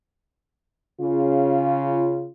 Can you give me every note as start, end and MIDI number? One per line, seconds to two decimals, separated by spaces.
1.00 2.27 49
1.00 2.27 65